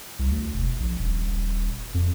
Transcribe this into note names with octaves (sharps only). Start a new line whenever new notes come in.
C2
D2
E1
A#1
D#1
F2